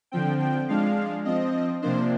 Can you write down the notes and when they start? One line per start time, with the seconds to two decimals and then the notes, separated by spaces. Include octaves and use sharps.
0.12 D3 F3 C4 G5
0.40 G5
0.68 F3 G#3 D4 F5
1.25 F3 C4 D#5
1.82 C3 F3 A#3 D4 C5